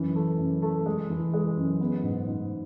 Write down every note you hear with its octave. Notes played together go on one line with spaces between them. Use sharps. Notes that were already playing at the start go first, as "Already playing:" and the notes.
Already playing: F#2 E3
A3
F#2
A3
G#3
E3
G#3
F#2
B3
G#2
G#2